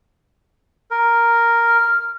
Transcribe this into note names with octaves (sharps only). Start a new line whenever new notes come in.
A#4
F6